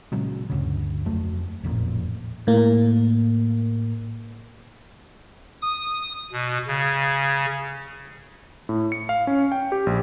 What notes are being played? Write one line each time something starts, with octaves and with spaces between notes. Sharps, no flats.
A#2 C#3 F#3 G#3
G1 D2 C#3
F2 F#3 A3
E1 A1 F2 A#2
A2 A#3
D#6
B2
C#3
A2
C#7
F5
C#4
G5
G4
A#1